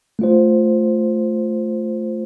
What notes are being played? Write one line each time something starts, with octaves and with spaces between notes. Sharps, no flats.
A3 F4 C5